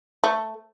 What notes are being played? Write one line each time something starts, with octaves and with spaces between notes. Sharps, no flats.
A3